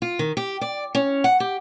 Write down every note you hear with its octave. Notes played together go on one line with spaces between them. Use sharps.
F4
D#3
G4
D5
C#4
F#5
G4